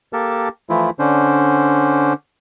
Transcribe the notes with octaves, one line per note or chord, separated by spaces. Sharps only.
A#3 G4 A4 A#4 A5
E3 F3 A3 E4 F4
D3 C#4 D4 C5